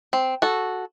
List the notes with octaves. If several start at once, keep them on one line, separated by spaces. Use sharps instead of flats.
C4
F#4 A4